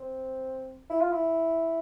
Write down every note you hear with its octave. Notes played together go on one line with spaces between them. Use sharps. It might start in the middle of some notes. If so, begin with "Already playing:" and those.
Already playing: C4
E4
F4
E4